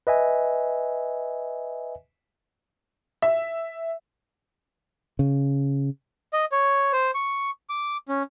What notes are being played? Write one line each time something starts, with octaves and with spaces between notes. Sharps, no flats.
B4 D#5 E5 G#5
E5
C#3
D#5
C#5
C5
C#6
D6
C#4